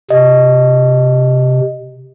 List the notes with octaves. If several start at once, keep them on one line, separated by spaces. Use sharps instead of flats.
C3 D#5